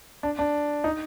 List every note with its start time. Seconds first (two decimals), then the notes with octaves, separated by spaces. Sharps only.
0.23 D4
0.39 D4
0.84 D#4